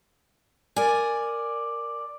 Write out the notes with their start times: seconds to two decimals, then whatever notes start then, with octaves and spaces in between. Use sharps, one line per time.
0.76 A#4 D5 G#5